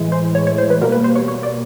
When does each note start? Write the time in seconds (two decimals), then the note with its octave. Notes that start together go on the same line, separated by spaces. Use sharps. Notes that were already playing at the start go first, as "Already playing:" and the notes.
Already playing: A2 E3 G#3
0.12 C5
0.35 C#5
0.47 C#5
0.58 C5
0.70 B4
0.81 B2 G3 A#3 A#4
0.92 B4
1.04 C5
1.15 C#5
1.28 C#5
1.43 D5